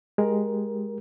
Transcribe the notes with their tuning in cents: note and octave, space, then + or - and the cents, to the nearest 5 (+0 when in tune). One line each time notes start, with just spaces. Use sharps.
G#3 +0 G4 +0 A#4 +15